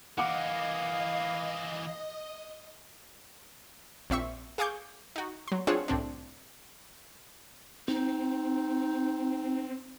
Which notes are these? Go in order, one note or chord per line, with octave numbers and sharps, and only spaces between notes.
E3 A#3 D#5 F5 F#5 D6
A#1 C4 E5 C#6
G#4 F5 G#5 C#6 D6 G6
D#4 F#4
F#3 C6
C4 D4 F4 G#4 C#5 F#5
C2 A2 C4 D4
C4 D#4